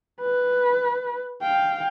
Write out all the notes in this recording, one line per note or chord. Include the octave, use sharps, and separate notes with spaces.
B4
F5 G5